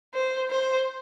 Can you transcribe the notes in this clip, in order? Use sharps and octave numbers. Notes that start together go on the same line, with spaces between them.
C5
C5